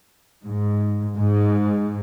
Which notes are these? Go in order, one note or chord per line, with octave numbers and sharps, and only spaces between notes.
G#2
G#2